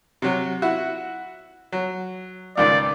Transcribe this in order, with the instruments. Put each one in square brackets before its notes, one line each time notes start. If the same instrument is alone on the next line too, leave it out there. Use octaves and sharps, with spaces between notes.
[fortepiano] C3 F#3
E4 F#4
F#3
[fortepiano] C#2 G#2 D#3 [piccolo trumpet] D5